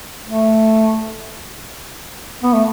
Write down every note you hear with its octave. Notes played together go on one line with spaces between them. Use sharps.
A3
B3
A3